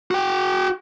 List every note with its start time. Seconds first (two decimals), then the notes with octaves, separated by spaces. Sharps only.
0.11 F#4 G5